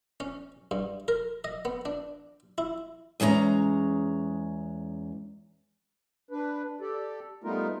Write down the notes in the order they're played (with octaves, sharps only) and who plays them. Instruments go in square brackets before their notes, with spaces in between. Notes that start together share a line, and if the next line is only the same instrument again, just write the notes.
[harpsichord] C#4
G2
A#4
D#5
B3
D4
E4
[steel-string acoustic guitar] E2 G#3 C#4 G5 A#5
[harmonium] D4 B4
G4 A4 D5
G3 A3 B3 D#4 F4 A#4